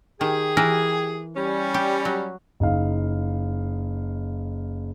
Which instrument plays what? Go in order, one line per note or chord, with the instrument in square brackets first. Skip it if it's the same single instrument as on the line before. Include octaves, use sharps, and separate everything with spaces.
[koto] D#3 [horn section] G4 G#4
[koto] E3 A#4 B4
[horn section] G3 C#4
[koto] G4
F#3
[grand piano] F#1 D#4 F5